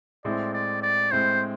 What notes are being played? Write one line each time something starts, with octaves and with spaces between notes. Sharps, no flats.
A2 G#3 C4 E4 D5
D5
D5
A2 G#3 C4 E4 C5